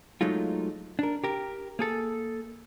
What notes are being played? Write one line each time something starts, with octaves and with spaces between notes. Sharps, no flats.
F#3 G#3 A3 D#4 F4
D4 A#4
G4 A#4
A#3 G#4 A4